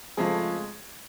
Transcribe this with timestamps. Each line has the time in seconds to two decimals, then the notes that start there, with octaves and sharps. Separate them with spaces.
0.17 F2 C#3 F3 G#3 A3 G#4